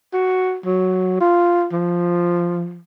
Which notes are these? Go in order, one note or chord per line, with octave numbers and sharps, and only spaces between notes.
F#4
F#3
F4
F3